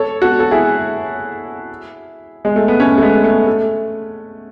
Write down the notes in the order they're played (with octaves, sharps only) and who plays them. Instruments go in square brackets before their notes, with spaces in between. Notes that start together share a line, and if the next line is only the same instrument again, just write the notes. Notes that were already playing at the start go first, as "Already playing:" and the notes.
Already playing: [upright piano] A4 C#5
F#4 A4
A4
E4 G#4
G#3
A3
B3
A3 C#4
A3
G#3 B3
A3
A3